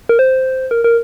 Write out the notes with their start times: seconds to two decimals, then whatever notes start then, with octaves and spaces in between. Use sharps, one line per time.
0.09 A#4
0.19 C5
0.71 A#4
0.84 A#4